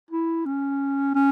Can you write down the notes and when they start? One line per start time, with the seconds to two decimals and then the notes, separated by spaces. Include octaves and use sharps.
0.11 E4
0.46 C#4
1.15 C#4